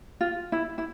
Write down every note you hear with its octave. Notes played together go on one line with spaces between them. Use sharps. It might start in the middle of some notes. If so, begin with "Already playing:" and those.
F4
E4
E4